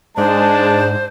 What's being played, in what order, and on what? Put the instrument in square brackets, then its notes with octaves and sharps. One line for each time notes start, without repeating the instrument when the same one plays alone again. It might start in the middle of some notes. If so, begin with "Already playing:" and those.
[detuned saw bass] G#2 [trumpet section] G#3 A5 [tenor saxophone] D4 [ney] C5